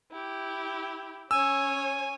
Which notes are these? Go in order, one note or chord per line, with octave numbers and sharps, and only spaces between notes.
E4 G4
C#4 C#5 G#5 E6